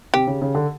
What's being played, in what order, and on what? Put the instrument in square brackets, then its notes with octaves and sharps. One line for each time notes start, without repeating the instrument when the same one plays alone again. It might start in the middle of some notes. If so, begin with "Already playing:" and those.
[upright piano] C3 [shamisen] G4
[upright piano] C#3
C#3
D3